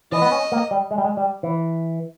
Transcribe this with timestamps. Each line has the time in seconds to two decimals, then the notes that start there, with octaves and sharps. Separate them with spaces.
0.12 E3 D#5
0.22 B3
0.32 C#4
0.52 A#3
0.71 G3
0.91 G#3
0.98 G3
1.04 G#3
1.17 G3
1.43 E3